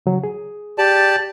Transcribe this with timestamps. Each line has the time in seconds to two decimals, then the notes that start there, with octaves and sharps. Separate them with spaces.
0.06 C#3 F#3
0.24 G#4
0.78 G4 D5 A5